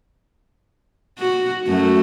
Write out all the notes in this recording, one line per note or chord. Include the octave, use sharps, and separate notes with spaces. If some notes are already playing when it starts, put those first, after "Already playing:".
F#4
F#2 A3 F#4